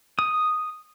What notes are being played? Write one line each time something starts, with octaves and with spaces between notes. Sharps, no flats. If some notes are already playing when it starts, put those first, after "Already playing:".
D#6